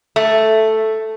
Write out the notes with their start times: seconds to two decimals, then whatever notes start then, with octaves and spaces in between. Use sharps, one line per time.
0.16 A3